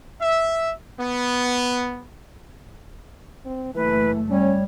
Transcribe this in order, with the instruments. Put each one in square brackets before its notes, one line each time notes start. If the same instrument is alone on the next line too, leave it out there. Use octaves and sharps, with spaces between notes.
[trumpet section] E5
B3
[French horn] C4
[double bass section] F#1 A3 [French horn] E3 [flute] B4
[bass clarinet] G3 [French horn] C#4 [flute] C#5